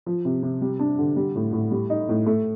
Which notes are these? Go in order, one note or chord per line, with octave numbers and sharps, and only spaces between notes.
F3
C3
C3
G3
D4
D3
G3
A2
A2
G3
D#4
A2
A3